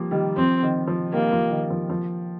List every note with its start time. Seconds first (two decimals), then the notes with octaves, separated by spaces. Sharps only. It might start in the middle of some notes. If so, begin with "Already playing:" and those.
Already playing: F3 G3 A#3
0.11 D#3 G3
0.37 F3 C4
0.63 D#3
0.88 F3
1.13 D#3 G3 A#3
1.32 F3
1.51 D#3
1.70 F3
1.90 F3